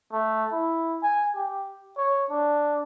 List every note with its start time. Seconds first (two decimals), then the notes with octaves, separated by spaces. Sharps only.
0.13 A3
0.52 E4
1.03 G#5
1.36 G4
1.97 C#5
2.30 D4